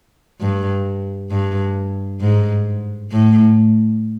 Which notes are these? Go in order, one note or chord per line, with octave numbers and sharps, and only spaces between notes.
G2
G2
G#2
A2